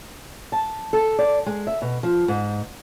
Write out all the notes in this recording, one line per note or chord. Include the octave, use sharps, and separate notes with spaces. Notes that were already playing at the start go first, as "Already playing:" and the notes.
A5
A4
D5
G#3
E5
B2
F3
G#2